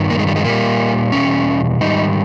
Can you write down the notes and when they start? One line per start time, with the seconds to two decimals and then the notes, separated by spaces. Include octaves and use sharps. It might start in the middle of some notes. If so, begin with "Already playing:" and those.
Already playing: G2 D#3
0.10 A#3
0.19 G#3
0.27 G3
0.36 G#3
0.44 A#2 G3 A#3
1.12 E2 B2 G3 C#4
1.80 G#2 D#3 G3 D#4